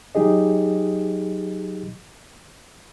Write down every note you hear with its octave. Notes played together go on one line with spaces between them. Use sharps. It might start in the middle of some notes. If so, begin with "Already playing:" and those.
F#3 D#4 G4 G#4 D#5